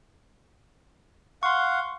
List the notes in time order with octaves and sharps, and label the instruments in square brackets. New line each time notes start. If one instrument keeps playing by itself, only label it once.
[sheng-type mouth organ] F5 F#5 [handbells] C6 C#6